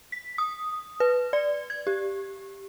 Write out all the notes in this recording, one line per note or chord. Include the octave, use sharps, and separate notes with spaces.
B6
D#6
B4
D5
G#6
G4